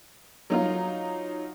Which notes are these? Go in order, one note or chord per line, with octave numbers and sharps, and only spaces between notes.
F#3 D#4 F4